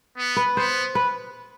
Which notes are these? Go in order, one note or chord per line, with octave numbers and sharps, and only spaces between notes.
B3
B4
B3 C5
B4